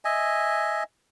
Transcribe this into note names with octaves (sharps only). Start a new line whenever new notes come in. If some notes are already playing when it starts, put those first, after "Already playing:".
D#5 E5 G#5